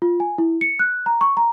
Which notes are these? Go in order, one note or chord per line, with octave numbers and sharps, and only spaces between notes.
F4
G#5
E4
C#7
F#6
A#5
C#6
A#5